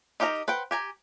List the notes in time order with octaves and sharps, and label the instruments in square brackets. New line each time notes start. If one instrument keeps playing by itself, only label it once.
[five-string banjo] D#4 G4 A#4 G5 A#5
B4 C5 F#5 G5
G4 G#5 A#5